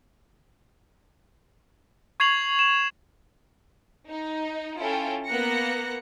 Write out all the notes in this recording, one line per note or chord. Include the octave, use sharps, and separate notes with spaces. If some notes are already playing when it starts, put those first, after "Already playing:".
C#6 G#6 C7 F7 F#7
E7
D#4
C#4 E4 F4 A4 G5
A#3 B3 F#6 A#6 C#7